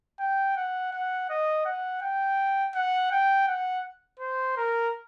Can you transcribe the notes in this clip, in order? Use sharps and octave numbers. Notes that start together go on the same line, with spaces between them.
G5
F#5
F#5
D#5
F#5
G5
F#5
G5
F#5
C5
A#4